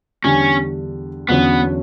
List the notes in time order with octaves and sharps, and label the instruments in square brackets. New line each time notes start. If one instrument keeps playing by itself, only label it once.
[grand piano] E2 D3 G3 D4 [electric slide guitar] C#4
[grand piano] E2 D3 F#3 C#4 [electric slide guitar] B3